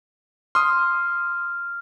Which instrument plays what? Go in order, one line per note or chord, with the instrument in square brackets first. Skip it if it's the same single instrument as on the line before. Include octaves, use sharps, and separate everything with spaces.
[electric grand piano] C6 D#6 [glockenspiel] F6